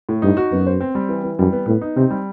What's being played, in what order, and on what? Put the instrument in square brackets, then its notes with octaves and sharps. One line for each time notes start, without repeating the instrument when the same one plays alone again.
[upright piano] A2
[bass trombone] G2 [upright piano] D#4
[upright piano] F#4
[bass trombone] F#2 [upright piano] B3
[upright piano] C5
C4
G3
E3
E3
[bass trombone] F#2 [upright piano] G3
[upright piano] B3
[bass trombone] A2 [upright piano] B3
[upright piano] D#4
[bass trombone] C3 [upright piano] C4
[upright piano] G3